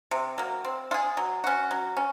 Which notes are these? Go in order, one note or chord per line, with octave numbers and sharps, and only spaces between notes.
C3
F#3 A#3
C4
F4
G#4
F#3
C#4 F#4
F#3
C#4